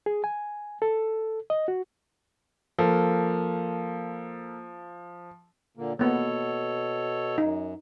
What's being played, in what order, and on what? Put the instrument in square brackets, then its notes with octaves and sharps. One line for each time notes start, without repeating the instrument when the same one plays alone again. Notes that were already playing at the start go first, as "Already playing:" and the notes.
[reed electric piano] G#4
G#5
A4
D#5
F#4
[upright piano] F3 [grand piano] A#3 A4
[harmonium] A#2 D3 A#3
[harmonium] B2 A4 C#5 [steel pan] A#3 B3
[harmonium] F#2 [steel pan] D#4